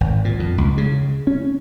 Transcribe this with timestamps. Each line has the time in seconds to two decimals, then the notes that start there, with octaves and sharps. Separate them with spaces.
0.01 G#1
0.25 A#2
0.39 F2
0.58 C#2
0.78 C#3
1.27 C#4